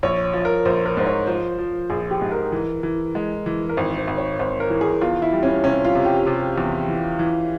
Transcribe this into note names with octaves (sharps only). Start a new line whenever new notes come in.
A#1 C#5
F3
A#4
A#1 C5
A#4
G#2 C5
C#5
F3 C5
F3
A#1 G#4
G4
G#2
A#4
E3
E3
G#3
E3
A#4
G#1 C5
C5
G#1
C#5
G#1 C5
A#4
E3
G#4
E2 F4
E4
G3
C#4
C3 C#4
F4
C3
G4
C3
E2
E3
E3